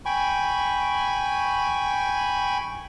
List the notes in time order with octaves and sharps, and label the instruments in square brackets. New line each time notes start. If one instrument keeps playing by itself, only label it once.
[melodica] G5 G#5 B5 C#6